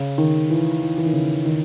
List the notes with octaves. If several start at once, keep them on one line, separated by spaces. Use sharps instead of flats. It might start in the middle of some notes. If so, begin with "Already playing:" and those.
Already playing: C#3
D#3
E3
E3
E3
D#3
C#3
D#3